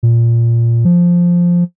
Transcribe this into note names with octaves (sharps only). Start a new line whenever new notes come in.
A#2
F3